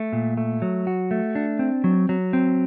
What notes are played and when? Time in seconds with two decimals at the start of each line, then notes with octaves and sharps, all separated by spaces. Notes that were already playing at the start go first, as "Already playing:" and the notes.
Already playing: A3
0.13 A#2
0.37 A3
0.62 F#3
0.87 F#4
1.11 A3
1.35 D4
1.59 C4
1.84 F#3
2.09 F#3
2.33 C4